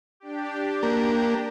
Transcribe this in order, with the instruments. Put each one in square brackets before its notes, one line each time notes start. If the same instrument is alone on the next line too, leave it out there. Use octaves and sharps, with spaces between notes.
[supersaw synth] D4 G4
[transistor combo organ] A#3